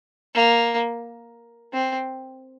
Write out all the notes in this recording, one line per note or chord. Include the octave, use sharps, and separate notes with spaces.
A#3
C4